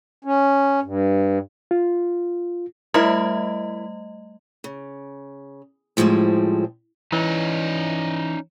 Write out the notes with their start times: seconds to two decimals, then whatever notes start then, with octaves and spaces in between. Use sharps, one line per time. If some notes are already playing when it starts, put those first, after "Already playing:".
0.25 C#4
0.83 G2
1.71 F4
2.94 G3 A3 E4 A#4 D#5
4.64 C#3
5.97 A2 F3 G3 G#3 C4
7.12 E3 C#4 D#4